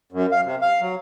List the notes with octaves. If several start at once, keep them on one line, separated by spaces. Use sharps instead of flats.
F#2
F5
C3
F5
F#3